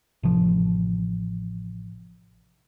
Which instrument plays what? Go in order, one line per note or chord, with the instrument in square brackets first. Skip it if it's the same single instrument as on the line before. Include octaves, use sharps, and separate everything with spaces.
[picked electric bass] A1 C3 F3